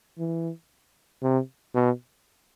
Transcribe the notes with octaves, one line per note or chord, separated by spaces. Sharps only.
E3
C3
B2